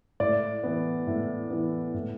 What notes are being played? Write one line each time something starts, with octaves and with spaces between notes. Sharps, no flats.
A2 D5
E3 B3
A2
E3 B3
A2